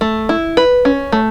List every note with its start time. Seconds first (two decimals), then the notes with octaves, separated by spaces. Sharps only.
0.01 A3
0.29 E4
0.57 B4
0.85 C#4
1.12 A3